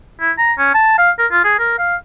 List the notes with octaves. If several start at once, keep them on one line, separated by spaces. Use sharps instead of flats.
E4
A#5
C#4
A5
F5
A#4
F4
G#4
A#4
F5